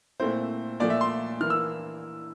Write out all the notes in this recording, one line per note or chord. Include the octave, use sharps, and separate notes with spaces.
A#2 A3 C4 E4 C5
A#2 F3 A3 D5
E5
C6
E3 A#3 E4 F6
E6